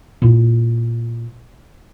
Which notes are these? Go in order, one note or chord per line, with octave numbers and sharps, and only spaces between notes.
A#2 E4